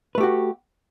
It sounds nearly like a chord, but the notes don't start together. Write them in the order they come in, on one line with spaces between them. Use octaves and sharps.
B4 A3 G4 F#4